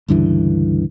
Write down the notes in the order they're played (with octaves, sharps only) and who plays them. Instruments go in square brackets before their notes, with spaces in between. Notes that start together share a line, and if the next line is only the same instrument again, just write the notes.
[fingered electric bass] C#2 G2 D3 E3